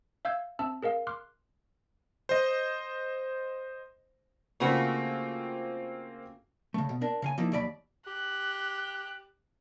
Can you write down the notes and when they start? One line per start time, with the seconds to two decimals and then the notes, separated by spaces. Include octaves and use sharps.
0.25 E5 F5 E6 G6 G#6
0.59 C4 E5 A5 E6
0.83 G#4 A#4 D#5 F5
1.07 C6 D6 F6 F#6
2.29 C5 D#5
4.60 C#3 A3 A#3 C4 F4 F#4
6.74 C#3 A3
6.89 B2
7.02 D4 A#4
7.22 C#3 F5 G#5
7.38 F3 A#3 D#4 E4
7.52 D#2 F#3 D5 F#5 B5
8.07 G4 F#6